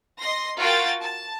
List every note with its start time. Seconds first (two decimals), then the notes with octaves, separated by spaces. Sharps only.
0.20 D#5 C6 A#6
0.58 F4 F#4 A#4 G5 A6
1.02 A5